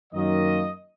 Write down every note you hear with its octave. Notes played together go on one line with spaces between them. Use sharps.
F#2 D#3 A#3 D#5